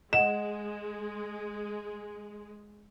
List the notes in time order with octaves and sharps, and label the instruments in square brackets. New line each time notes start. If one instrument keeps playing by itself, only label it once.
[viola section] G#3 [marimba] D#5 F#5 [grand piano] E7